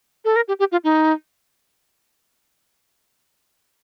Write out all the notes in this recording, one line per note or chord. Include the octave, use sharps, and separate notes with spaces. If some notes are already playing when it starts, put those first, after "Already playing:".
A4
A#4
G4
G4
F4
D#4